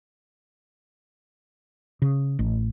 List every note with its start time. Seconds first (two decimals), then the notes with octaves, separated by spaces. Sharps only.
2.02 C#3
2.39 A1